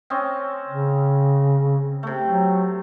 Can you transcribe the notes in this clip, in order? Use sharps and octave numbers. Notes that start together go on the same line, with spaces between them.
C4 C#4 D#5
C#3
C3 A3
F#3